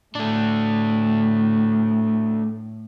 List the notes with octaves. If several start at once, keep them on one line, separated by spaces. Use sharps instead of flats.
A2 A3 D4